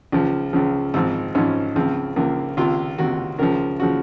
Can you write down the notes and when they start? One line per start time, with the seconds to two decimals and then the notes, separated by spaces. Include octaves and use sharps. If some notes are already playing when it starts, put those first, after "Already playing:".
0.12 C#2 C#3 F3
0.53 C#2 C#3 F3
0.94 G#1 G#2 F3 C4
1.35 G#1 G#2 F3 C#4
1.76 C#2 C#3 F3 C4
2.16 C#2 C#3 F3 A#3
2.57 C#2 C3 D#3 F4
2.98 C#2 C3 D#3 F#4
3.39 C#2 C#3 F3 A#4
3.80 C#3 F3 F#4